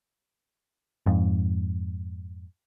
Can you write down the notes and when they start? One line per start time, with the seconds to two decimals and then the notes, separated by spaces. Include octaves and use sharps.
1.06 F2 G#2